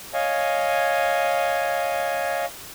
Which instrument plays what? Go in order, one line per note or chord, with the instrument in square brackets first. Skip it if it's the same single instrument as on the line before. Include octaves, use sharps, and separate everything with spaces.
[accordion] C#5 D#5 F5 G#5